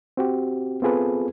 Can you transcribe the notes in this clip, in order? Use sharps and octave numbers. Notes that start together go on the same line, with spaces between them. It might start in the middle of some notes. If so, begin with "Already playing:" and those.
C4 F#4 G4
B3 C4 F4 G#4 A4 B4